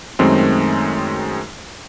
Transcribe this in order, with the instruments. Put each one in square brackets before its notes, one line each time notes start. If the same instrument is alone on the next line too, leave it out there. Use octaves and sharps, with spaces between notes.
[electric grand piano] F#2 D#3 G#3 A3 C4